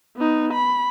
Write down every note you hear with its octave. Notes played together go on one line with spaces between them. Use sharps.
B3 D#4
B5